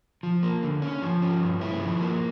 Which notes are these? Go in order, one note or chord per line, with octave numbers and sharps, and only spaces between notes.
F3
A#3
D3
C#4
F3
C#4
G2
E4
F3
A#3